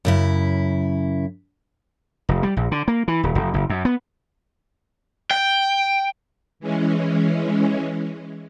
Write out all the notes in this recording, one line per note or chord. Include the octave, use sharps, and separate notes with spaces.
F#2 C#3 E4
F1
G3
A#1
D3
A#3
E3
D#1
F1
F#1
F#2
B3
G5
E3 G#3 C#4